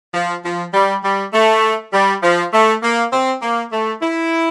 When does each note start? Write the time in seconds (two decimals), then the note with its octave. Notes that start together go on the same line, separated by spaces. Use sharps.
0.14 F3
0.44 F3
0.74 G3
1.03 G3
1.33 A3
1.93 G3
2.23 F3
2.53 A3
2.83 A#3
3.12 C4
3.42 A#3
3.72 A3
4.02 E4